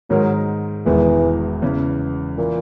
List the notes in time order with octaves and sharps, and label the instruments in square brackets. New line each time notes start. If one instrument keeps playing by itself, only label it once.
[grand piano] G#2 D#3 G#3 D#4 A#4 [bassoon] F#3
[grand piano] E1 E2 D#3 G#3 B3 [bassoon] E3
[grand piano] E2 C#3 E3
[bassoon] A#2 [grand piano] E3